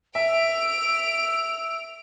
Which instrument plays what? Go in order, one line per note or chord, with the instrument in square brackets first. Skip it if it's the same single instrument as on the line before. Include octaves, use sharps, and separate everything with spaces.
[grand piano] E5 [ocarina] E6 [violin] D7 F7